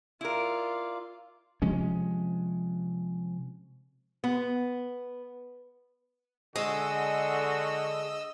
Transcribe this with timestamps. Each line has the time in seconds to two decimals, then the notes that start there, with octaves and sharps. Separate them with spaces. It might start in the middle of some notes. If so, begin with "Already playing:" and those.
0.21 E4 F4 A#4 D5
1.62 C3 F3 G#3 C#4
4.24 B3
6.56 D3 G#3 F#4 D#5 E6